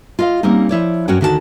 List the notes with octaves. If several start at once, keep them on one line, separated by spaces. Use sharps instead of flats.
F4 D#5 F5
G3 A#3 C4 C#4 D#4
F3 E4 C#5 D5
F#2 C#4 F#4 C#5 F#5 G5
D2 D3 D#3 F#4 A4 A5